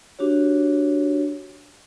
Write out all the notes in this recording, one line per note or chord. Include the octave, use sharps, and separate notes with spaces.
D4 F#4 G4 C#5